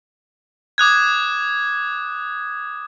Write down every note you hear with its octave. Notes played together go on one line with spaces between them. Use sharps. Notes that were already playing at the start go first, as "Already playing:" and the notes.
D6 D#6 F#6 G#6